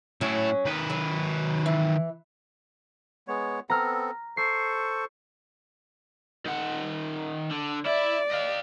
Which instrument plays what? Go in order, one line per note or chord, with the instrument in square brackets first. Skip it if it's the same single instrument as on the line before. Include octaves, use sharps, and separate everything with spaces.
[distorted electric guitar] A2 E4 [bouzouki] F#3 C#4
[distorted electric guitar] D#3 B4
[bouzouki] F#3
E3
[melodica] G#3 B3 C#5
[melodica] B3 C4 A4 [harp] A#5 F6
[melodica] A4 C5 C#6 [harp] C7
[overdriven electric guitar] D#3 F#5
D3
[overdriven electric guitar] E4 E5 [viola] D5
[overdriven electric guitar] D#5 F5